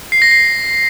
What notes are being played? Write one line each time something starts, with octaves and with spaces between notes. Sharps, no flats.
C7
A#6
C7